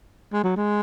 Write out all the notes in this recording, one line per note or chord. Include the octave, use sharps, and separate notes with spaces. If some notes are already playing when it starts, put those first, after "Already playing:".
G#3
F#3
G#3